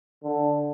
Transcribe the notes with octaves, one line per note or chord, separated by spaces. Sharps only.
D3